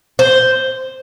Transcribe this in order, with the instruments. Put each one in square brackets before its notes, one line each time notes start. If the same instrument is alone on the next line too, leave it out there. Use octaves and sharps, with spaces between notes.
[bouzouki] C5